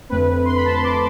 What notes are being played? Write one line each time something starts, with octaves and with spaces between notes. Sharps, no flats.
F2 D3 A3 C4 B4
C6
B5
A5
C6
D6